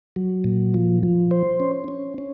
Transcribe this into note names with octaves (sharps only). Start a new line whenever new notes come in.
F#3
A#2
F3
F3
C5
C#4
C#4
C#4